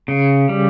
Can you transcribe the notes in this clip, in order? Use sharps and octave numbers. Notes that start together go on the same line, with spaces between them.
C#3
G3